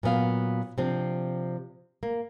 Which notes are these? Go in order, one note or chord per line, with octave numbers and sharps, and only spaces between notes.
A#2 F#3 B3 F5
C3 F3 C4 D4
A#3